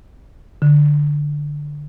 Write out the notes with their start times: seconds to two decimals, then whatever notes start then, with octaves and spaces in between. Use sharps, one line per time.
0.62 D3